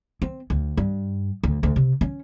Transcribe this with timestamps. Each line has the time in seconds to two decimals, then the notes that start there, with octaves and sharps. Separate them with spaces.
0.22 C4
0.50 D2
0.77 G2
1.43 D2
1.63 D2
1.76 C3
2.01 C#4